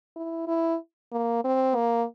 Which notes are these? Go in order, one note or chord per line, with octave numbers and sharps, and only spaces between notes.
E4
E4
A#3
C4
A#3